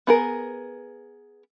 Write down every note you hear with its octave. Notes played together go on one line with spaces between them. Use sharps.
B3 G#4 A#4